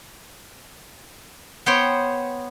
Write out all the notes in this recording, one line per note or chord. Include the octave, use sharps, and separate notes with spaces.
B3 C5 C#5 G5